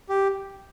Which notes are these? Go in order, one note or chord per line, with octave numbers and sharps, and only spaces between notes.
G4